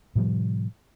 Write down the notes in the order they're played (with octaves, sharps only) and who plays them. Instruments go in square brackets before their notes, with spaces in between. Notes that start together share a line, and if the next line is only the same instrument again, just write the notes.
[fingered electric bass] A2 C3 F3 G3